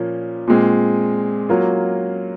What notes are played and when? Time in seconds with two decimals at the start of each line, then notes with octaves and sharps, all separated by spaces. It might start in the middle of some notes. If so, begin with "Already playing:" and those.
Already playing: A#2 F3 A#3 C#4
0.47 A#2 G#3 C4
1.49 F#3 A#3 C#4 F4